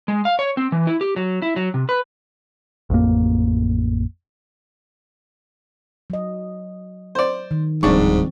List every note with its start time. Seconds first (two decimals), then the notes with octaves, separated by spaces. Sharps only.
0.08 G#3
0.25 F5
0.39 C#5
0.57 C4
0.72 E3
0.87 E4
1.01 G4
1.16 F#3
1.42 E4
1.56 F#3
1.74 C3
1.89 B4
2.90 A1 F2 A#3
6.10 F#3 D#5
7.15 C5 D5
7.51 D#3
7.83 D1 G#2 F3 G3 C4 D4 C#6